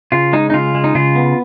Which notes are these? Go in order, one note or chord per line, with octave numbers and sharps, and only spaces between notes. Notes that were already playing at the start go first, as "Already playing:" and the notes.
C#3 F4
G#3 D#4
D#4
C#3 F4
G#3
D#4
C#3 F4
B3